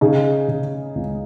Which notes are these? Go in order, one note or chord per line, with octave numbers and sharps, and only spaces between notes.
C#3 D#4 G#4
C#3
C#2